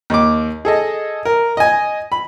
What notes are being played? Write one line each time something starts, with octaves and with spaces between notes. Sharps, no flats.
D#2 D6
G#4 A4 D#5
A#4
D#5 G#5
B5